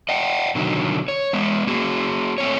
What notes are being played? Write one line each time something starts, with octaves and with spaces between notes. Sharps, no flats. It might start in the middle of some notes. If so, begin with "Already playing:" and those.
D#5 F#5 G5
B2 D3 D#3 F#3
C#5
G#3 B3
A#3 F#4 G#4
A3 C4 C#5